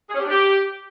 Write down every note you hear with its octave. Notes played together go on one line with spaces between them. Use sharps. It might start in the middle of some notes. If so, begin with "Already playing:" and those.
G#4
C#4
G4
D4
G4